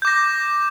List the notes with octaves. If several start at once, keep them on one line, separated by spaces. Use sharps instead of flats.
D6 G6 A#6